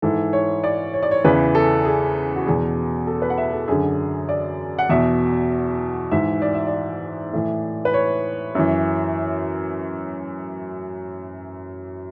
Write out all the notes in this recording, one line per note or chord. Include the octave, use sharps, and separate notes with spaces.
G#2 E3 A4
C#5
D5
C#5
D5
C#5
E2 C#3 E3 B4
A4
G#4
F#4
E2 B2 G#4
A4
B4
F#5
E5
A4
F#2 D3 G#4
D5
F#5
E2 B2 E5
G#2 E3 E5
D5
E5
D5
A2 E3
B4
C#5
F#2 E3